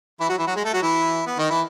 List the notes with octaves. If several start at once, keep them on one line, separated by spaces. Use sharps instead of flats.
E3 E4
F#3 F#4
E3 E4
F#3 F#4
G#3 G#4
A3 A4
F#3 F#4
E3 E4
B3
D#3 D#4
E3 E4